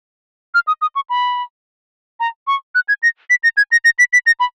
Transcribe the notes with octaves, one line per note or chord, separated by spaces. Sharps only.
F6
D#6
D#6
C#6
B5
A#5
C#6
F#6
G#6
A#6
B6
A#6
G#6
A#6
A#6
B6
B6
A#6
B5